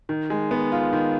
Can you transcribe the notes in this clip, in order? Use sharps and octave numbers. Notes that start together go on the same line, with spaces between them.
D#3
G#3
B3
F4
D#3